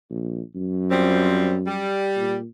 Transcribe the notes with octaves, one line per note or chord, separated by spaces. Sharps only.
A#1
F#2
F3 G3 C4
G3
A#2